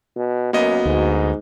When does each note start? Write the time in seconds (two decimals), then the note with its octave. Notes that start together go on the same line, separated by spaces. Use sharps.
0.16 B2
0.53 F#2 A#3 B3 F#4 D#5
0.85 D2 G#2